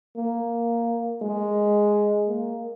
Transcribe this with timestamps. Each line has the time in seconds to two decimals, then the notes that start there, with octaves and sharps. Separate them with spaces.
0.16 A#3
1.22 G#3
2.28 A#3